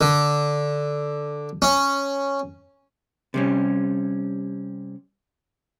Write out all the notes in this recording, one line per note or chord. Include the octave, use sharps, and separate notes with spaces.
D3
C#4
C3 G3 C#4